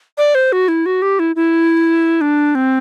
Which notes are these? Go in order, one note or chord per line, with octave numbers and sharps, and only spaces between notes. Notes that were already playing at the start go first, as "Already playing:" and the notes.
D5
C5
F#4
E4
F#4
G4
E4
E4
D4
C4